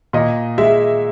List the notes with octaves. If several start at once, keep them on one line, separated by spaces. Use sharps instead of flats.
A#2 D#5
G#3 E5